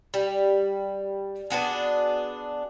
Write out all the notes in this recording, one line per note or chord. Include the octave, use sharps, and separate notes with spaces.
G3
B3 D4 F#4 G#4